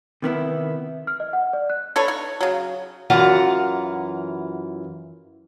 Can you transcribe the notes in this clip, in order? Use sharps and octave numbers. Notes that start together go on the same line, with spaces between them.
C3 D#3 B3 E4
F6
D#5
F#5
D5
F#6
D4 A4 B4 C#5
D#4
C#3 F#3
F#2 E3 F4 F#5 A#5